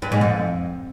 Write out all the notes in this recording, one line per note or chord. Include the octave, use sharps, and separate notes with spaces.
G2
G#2
F2